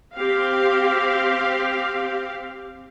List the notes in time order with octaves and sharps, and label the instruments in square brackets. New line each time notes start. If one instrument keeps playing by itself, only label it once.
[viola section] C4 G4 F5